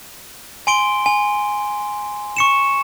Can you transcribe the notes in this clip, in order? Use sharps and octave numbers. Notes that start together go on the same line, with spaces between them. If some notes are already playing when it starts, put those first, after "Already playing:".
G#5 C6 D7 G7
G#5
C#6 C#7 E7